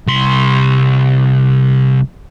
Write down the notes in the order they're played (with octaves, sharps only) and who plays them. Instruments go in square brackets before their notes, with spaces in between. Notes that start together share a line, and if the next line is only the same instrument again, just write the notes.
[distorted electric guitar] C2 C6